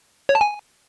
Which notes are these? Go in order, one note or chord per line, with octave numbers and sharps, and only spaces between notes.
C#5
A5
G#5